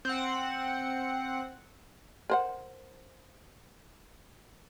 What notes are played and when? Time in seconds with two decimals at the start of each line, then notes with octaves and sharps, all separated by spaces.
0.05 C4 F#5
2.30 A#4 C5 F#5